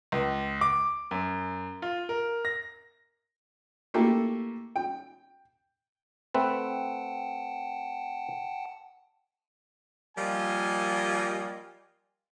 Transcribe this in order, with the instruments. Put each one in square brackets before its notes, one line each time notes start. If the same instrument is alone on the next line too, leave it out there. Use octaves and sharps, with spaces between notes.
[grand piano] C#2
D6
F#2
F4
A#4
A#6
[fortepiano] A3 A#3 E4 G4 A4
G5
[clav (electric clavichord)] A3 C4 B4 [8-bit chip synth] F#5 G5 A5
[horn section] F3 G3 A#3 F4 D#5 G#5